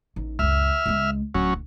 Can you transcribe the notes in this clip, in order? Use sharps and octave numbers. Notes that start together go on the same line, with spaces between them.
A1 D#4
C#2 F#2 E5 F6
C#2 G#3
D1 F#3 C#4